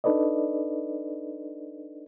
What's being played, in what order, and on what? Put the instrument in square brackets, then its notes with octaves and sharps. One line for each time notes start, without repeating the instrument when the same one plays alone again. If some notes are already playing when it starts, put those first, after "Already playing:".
[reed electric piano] D4 D#4 A4 B4 D5 D#5